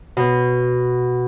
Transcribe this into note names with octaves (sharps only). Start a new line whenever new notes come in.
B2